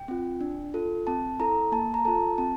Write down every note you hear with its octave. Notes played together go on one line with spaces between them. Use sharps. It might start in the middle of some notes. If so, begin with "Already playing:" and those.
Already playing: G5
C4 F4
D4
F4 A4
C4 A5
E4 A4 A#5
A#3 A5
A#5
F4 A4 A5
C4 A5